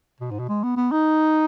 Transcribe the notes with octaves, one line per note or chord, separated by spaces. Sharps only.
B2
G#2
B2
G#3
B3
B3
D#4